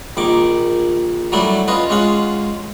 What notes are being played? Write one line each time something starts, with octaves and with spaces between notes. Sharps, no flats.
A#1 D#3 D6
F#3 G3 A3 D4 E4
C#4 F4 B4 D#5
G#3 C#4 F4 F#5